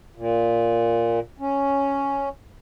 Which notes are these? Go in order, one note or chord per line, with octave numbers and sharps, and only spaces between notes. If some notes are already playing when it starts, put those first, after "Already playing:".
A#2
C#4